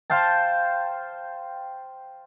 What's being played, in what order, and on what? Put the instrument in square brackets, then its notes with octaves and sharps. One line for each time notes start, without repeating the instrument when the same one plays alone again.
[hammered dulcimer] C5 F5 G5 A5